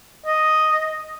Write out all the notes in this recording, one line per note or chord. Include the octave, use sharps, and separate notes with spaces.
D#5